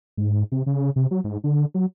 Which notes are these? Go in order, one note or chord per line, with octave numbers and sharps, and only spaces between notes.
G#2
C3
C#3
C3
F#3
G#2
D3
F#3